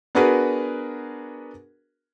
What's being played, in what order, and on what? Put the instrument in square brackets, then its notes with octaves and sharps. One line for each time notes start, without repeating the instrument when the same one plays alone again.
[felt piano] B3 D4 F#4 G#4 A#4 B4